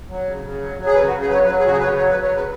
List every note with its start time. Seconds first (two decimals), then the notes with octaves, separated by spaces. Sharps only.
0.09 F#3
0.26 C#3
0.44 C#3
0.60 F#3
0.78 F#3
0.86 G#4
0.94 C#3 B4
1.07 F#4
1.12 C#3
1.21 G#4
1.29 F#3 B4
1.34 C#5
1.46 F#3 B4
1.59 G#4
1.63 C#3 F#4
1.72 G#4
1.79 C#3 B4
1.84 C#5
1.97 F#3 C#5
2.10 B4
2.15 F#3
2.22 C#5
2.31 C#3 B4